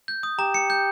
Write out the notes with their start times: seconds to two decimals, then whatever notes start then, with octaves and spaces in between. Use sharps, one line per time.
0.08 G6
0.23 D#6
0.39 G4 A#5
0.54 C#7
0.70 G6